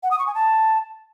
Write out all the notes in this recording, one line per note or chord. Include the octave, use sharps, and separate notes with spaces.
F#5
D#6
C#6
G#5
A5